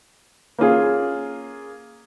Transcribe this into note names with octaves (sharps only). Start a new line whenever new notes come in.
A#3 C#4 F4 G#4